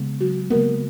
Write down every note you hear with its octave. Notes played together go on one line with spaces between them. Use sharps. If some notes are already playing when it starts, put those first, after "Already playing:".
Already playing: C#3 G#3 B3
F#3 F#4
C#3 G#3 A#3 B3 A#4